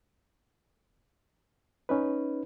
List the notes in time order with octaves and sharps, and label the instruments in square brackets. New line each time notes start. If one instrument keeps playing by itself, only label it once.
[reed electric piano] C#4 D#4 B4